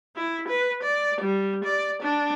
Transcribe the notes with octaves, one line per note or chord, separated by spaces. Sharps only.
E4
B4
D5
G3
D5
D4